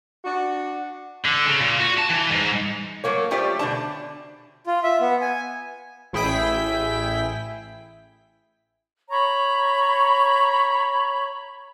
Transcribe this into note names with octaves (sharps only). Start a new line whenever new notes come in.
D4 F#4
D3
C#3
A#2
F#4
A5
E3
G#2
F#3 A3 A#3 C#5
G3 A3 F4 G4 C5 D5
B2 D3 D4 A5
F4
E5
B3
G#5
A1 E4 G#4 G5 B6
C#5 A#5 B5 C#6